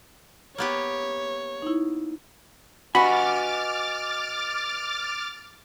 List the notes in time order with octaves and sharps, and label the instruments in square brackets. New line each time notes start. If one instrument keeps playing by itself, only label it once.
[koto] A#3 B3 G4 [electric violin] C#5
[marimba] D#4 E4
[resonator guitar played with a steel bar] F#4 [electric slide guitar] B4 D#5 G#5 [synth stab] B5 [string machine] D6 F6 A6